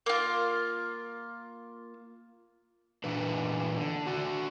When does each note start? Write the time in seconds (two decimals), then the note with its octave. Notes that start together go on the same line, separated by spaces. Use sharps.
0.06 A#3 F4
3.04 A#2 E3 D4 B4
3.78 D3
4.07 D4 F#4